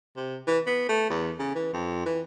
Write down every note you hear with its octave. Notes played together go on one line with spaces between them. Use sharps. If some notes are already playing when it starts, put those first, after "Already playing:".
C3
E3
B3
A3
E2
C#3
E3
F2
E3